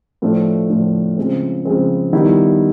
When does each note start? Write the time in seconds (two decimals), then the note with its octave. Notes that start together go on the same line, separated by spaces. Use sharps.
0.22 A2 F3 A3 D4
0.70 A2 F3 A3 D4
1.18 C#3 F3 G#3 C4
1.65 C#3 F3 G#3 C4
2.13 D#3 G3 B3 E4